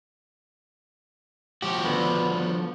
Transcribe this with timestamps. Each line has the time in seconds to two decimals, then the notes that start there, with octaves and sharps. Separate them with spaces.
1.62 F3 F#4 G4
1.85 D3 B3